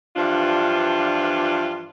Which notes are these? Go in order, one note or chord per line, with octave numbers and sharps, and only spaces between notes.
G2 E3 F3 D4 F4